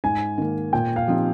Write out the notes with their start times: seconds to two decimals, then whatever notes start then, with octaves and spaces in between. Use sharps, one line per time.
0.04 G#2 G#5
0.38 D#3 A#3
0.73 A#2 G5
0.96 F5
1.08 F3 C4 D#4 G4